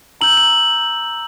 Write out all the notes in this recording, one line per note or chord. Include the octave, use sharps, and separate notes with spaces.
A#5 E6 G6 F#7
F#7